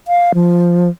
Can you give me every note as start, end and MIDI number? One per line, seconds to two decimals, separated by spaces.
0.08 0.32 77
0.35 0.88 53